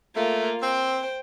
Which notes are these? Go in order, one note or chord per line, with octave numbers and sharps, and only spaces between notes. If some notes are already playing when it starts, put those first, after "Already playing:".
A3 A#3 F4
C4 C5 G5